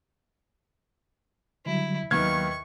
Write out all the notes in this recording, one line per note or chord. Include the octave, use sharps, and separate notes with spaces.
D3 F#3 G3 E4
D#2 D#3 F#3 B3 C#6 F6 G#6